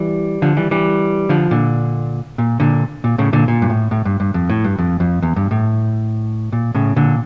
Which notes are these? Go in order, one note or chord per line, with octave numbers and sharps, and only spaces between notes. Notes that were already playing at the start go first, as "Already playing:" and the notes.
Already playing: E3 G3
D3 F3
E3 G3
E3 G3
D3 F3
A#2 D3
A#2
A#2 D3
A#2
A2 C#3
A#2 D3
A#2
G2
A2
A2
G2
G2
F2
A2
G2
F2
F2
E2
G2
A2
A#2
A2 C#3
A#2 D3